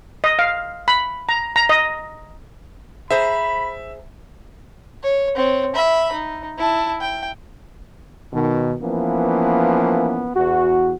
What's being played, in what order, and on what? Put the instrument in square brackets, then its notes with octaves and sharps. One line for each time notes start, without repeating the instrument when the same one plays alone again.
[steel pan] D#5
F5
B5
A#5
A#5
D#5
[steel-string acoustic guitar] G#4 C5 A#5 [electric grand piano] E5 [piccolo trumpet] B5
[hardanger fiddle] C#5
C4 C#5
E5 B5
D#4
E4 A5
G5
[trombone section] B2 D#3
E3 F3 A#3 B3 C#4
E2 F#4